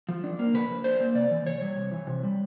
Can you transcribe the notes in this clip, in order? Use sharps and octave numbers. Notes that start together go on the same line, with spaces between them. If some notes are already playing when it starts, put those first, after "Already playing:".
F3
D4
A#3
C#3 B4
F3
D4 C5
A#3
C3 D5
E3
C3 C#5
G3
C3
E3
C3
G3